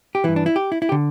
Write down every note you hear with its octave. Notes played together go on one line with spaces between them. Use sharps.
G4
G2 E3 E4
D4
E4
G4
E4
E4
G4
D3